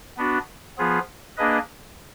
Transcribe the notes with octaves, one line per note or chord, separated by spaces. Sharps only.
B3 D4 F#4
F3 B3 F4 G#4
A#3 D4 G#4 B4 D#5